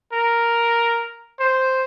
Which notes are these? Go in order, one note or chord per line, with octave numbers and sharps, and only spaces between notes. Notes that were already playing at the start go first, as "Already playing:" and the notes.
A#4
C5